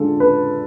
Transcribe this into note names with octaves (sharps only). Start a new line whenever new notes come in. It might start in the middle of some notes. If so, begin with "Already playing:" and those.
Already playing: D3 G#3 D4 F4 A4
B4